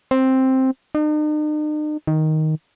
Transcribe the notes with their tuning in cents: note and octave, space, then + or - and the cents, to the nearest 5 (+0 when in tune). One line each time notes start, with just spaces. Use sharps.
C4 +5
D#4 -45
D#3 +5